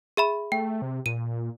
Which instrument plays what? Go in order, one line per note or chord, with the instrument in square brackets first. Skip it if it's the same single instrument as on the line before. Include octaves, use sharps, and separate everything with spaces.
[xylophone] G#4 E5 B5
[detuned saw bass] A3 [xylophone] G5
[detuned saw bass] C3
[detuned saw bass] A#2 [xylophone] D#7